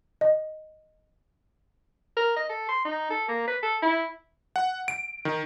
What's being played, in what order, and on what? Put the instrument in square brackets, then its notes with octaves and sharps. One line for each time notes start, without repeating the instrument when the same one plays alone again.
[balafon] D#5
[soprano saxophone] A#4
D#5
A4
C6
D#4
A4
A#3
B4
A4
E4
[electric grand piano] F#5
D7
D#3